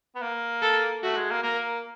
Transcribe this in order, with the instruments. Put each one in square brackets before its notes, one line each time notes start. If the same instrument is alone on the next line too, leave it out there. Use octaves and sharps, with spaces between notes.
[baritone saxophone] B3
A#3
[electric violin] A4
[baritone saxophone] A3 [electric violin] F#4
[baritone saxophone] G#3
A#3
[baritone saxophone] A#3 [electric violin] A#4